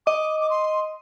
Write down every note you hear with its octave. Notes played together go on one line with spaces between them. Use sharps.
D#5 D6
D6
C6